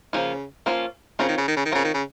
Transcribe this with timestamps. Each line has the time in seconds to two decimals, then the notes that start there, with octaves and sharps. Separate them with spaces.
0.13 C#3 F3 A#3 C#4 F4
0.66 F3 A#3 C#4 F4
1.19 C#3 C4 F4 A#4 C#5
1.28 D#3
1.37 C#3
1.48 D#3
1.56 C#3
1.65 D#3
1.71 C#3 C4 F4 A#4 C#5
1.85 D#3
1.94 C#3